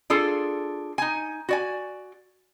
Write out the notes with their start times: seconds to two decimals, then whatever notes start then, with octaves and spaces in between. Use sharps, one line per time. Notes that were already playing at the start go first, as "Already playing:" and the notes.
0.10 D4 F4 G#4 A4
0.98 D#4 G#5
1.49 F#4 D5 G#5